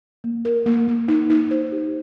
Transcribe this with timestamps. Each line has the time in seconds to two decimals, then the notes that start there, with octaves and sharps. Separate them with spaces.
0.24 A#3
0.45 A#4
0.66 A#3
0.88 A#3
1.08 D#4
1.30 D#4
1.51 C5
1.72 G4